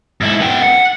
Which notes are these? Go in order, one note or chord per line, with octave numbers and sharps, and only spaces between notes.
G#2 E4
B3 G5
F#5